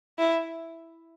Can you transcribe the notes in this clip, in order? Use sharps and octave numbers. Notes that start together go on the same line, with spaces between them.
E4